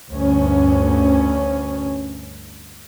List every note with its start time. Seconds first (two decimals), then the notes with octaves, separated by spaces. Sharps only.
0.10 D2 G2 C#4